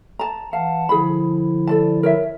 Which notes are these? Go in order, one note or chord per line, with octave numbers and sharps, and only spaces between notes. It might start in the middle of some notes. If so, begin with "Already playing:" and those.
A5 A#5
E3 F5 F#5 A5
D3 F3 E4 G#4 B5
A4 D5 A5
A#4 C#5 E5